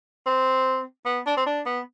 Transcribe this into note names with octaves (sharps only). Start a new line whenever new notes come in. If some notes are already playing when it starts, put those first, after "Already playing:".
C4
B3
D4
C4
D4
B3